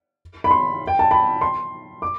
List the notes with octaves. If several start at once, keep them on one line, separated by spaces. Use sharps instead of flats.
B5
C6
G5
A5
B5
C6
D6